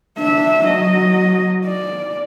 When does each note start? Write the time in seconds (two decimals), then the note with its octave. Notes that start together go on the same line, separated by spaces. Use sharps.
0.18 D4 E5
0.66 F#3 D#5
1.66 D5